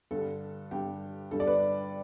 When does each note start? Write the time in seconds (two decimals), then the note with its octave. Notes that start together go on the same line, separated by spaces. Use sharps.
0.11 G2 D3 G3 A4
0.71 G2 D3 G3 G4
1.31 G2 D3 G3 A4
1.40 D5
1.47 B4